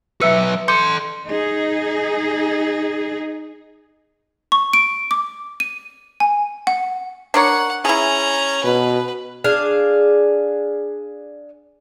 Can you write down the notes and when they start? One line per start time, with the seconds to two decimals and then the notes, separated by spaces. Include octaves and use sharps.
0.21 F#3 B4 E5 E6 C#7
0.68 A4 C6 D6 G6 C#7
1.26 D#4 G#4
4.52 C#6
4.73 D7
5.11 D6
5.60 D#7
6.20 G#5
6.67 F#5
7.34 D4 A#4 C#5 F#5
7.85 C#4 E4 G#4 A#5
8.64 B2 B4
9.44 D4 G#4 F5